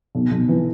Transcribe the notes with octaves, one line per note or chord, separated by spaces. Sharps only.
B1
B1
E3